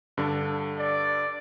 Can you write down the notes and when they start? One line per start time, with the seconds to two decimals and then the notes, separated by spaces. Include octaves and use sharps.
0.17 G2 D3 D4
0.79 D5